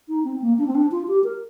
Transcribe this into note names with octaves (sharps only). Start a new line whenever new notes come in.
D#4
C4
A#3
D4
C4
D4
F4
G4
A#4